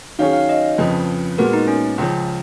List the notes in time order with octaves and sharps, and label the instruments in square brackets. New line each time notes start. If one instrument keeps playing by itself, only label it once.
[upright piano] D#3 F#3 C#4 G#4 C#5 [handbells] F5
[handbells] F5
D#5
[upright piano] F2 C#3 F3 [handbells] B4
[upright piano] A#2 G#3 B3 F#4 [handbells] A#4
[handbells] D#4
C#4
[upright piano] C#2 C#3 F3